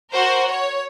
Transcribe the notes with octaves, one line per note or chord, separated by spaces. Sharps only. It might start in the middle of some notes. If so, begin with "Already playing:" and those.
F#4 A#4 C5
C#5